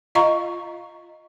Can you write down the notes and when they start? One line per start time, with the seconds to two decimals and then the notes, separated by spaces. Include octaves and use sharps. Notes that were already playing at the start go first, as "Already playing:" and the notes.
0.15 F4 D#5 F5 A#5 C#6